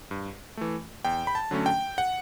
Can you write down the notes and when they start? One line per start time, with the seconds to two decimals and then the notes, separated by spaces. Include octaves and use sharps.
0.11 G2
0.57 E3 A3
1.05 E2 G5
1.27 B5
1.35 A5
1.51 D3 F#3 A3 C#4
1.66 G5
1.98 F#5